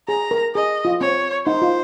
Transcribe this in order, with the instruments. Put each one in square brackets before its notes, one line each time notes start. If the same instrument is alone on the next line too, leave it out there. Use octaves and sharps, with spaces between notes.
[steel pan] G#4 [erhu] A#5
[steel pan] A#4
[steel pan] G#4 [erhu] D#5
[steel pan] F4
[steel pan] C4 [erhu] C#5
[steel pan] D#4 [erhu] C5
[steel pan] F4